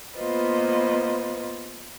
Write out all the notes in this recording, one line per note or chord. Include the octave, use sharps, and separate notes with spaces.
A#3 B3 F4 B4 C5 D#5